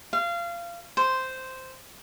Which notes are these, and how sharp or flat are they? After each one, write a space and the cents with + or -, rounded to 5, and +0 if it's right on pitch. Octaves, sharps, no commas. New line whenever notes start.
F5 -25
C5 -5